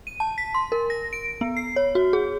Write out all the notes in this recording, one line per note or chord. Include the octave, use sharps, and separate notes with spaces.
D#7
A5
B6
C6
A#4
A#6
D7
B3
C7
C#5
F#4
G#4